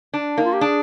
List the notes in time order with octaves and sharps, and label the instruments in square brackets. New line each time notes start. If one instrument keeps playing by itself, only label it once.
[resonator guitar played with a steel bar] D4
[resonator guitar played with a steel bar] A#3 [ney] D#4
[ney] F4
G4
[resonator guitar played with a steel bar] D4 [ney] G#4